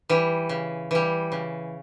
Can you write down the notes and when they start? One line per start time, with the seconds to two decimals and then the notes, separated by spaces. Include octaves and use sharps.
0.09 E3 G3
0.49 C#3
0.91 E3 G3
1.32 C#3